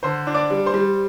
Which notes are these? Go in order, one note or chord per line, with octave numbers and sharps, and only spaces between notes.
D3 C5 C6
D4
D5 D6
G3
C5 C6
G3